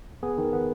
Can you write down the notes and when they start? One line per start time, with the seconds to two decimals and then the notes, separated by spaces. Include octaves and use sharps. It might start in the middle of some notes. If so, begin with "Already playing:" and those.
0.23 B3 G#4
0.38 D#3
0.53 B3